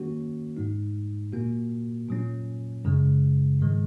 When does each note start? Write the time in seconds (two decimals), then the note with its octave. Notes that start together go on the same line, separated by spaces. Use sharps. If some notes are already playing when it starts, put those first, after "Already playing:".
Already playing: D#3 A#3 C#4 F#4
0.57 G#2 G#3 D#4
1.33 A#2 A#3 F#4
2.09 A#2 F#3 C#4
2.84 F#2 C#3 G#3
3.60 G#2 D#3 G#3